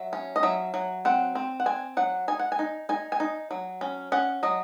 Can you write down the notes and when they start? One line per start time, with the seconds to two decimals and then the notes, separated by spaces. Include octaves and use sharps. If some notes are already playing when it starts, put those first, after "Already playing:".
Already playing: F#3 E5
0.13 C#4
0.36 D#5
0.43 F#3 E5
0.74 F#3
1.05 C4 F#5
1.35 C4
1.60 F#5
1.66 C4 G#5
1.97 F#3 F#5
2.28 D#4 G#5
2.39 F#5
2.52 G#5
2.59 D#4
2.89 D#4 G#5
3.12 G#5
3.20 D#4
3.51 F#3
3.81 C#4
4.12 C#4 F#5
4.43 F#3 D#5